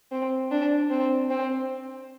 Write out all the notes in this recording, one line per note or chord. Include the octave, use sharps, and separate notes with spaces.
C4
D4
C4
C4